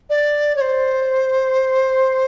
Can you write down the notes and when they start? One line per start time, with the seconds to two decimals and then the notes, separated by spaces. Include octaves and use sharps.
0.09 D5
0.56 C#5
0.61 C5